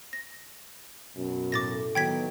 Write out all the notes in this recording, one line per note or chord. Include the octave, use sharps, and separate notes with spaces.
A#6
F#2 B2
A2 D6 A6 A#6
D#3 F#3 B3 G5 G#6 B6